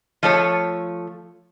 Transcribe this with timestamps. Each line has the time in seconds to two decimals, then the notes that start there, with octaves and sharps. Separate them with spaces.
0.23 F3 A3 C#5